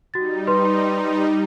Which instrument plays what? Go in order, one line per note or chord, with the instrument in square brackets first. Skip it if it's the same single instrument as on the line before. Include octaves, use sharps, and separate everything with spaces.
[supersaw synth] G3 D#4 [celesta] F#4 A6
[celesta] B4 C6